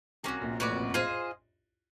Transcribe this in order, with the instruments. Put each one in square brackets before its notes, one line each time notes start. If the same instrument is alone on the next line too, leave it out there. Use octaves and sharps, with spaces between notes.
[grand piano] C2 C3 [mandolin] A#3 C#4 F#4
[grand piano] A#1 A#2
[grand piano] A1 A2 [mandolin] C#4 F#4 B4 D5
[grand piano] F2
F#2
[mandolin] F4 G#4 C5 D#5